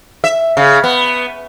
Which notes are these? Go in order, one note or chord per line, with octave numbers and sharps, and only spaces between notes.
E5
C#3
B3